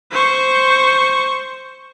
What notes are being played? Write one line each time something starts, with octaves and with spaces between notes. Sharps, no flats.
C5 C#6